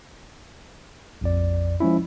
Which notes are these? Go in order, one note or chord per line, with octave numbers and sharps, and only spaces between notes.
A#1 F2 D5
F3 G#3 C#4 E4